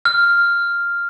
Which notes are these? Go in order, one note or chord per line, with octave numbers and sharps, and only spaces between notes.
F6